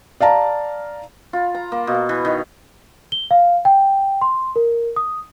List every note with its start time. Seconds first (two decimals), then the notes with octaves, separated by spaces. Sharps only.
0.20 D5 F5 A5 A#5
1.33 F4
1.55 A#5
1.72 A#3
1.87 B2
2.09 E3
2.25 D#3
3.12 G7
3.31 F5
3.65 G5
4.22 C6
4.56 A#4
4.96 D#6